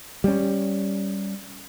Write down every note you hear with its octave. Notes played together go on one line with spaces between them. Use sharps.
G3 C#4